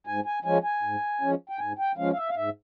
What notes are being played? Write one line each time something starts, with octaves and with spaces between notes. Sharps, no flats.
G#2 G#5
G#5
F3 G#3 C#4 G#5
G#5
G#2
F3 G#3 C#4
G5
G#2 G#5
G5
F3 G#3 C#4 F5
F5
E5
F5
G#2 E5